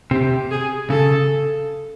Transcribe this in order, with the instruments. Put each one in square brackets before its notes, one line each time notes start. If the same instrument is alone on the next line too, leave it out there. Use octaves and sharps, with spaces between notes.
[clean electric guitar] C3 [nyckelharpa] G4
[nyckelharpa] G#4
[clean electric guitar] C#3 [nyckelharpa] A4